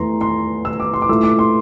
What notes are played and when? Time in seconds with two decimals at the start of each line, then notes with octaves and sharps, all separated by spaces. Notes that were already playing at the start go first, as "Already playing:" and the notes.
Already playing: E2 E3 A3 A#5 C6
0.21 C6
0.65 E6
0.80 D6
0.94 C6
1.02 D6
1.09 A#2 A3 E4 E6
1.24 D6
1.39 C6